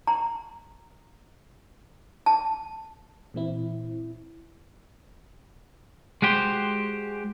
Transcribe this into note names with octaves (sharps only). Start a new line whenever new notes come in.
A#5
A5
A#2 E3 C4 E4
G#3 F#4 G4 C5